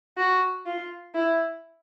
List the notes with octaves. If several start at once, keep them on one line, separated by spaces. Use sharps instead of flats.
F#4
F4
E4